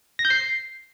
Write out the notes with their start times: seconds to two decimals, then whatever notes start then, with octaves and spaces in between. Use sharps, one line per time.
0.19 A#6
0.25 G6
0.30 C7